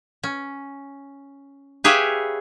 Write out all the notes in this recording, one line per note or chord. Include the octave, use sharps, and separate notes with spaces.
C#4
G4 G#4 B4 C#5 E5 F5